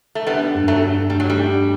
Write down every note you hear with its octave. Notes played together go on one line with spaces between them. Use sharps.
A3
G3 B3 D4
G2
F#3 A3
D4
G3 A3
F#3
G3
D4